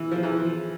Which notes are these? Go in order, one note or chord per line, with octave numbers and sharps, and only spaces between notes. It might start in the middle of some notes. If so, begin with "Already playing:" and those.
Already playing: E3
F3
E3